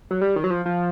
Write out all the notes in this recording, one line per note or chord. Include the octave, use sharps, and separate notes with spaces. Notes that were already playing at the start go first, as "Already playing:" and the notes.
F#3
G3
D#3
F#3
F3
F3